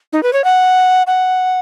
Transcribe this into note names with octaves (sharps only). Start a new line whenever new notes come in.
D#4
B4
C#5
F#5
F#5